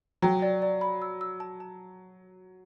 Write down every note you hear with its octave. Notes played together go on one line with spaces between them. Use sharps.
F#3 G5
D5
D5
B5
E6
E6
A5
A5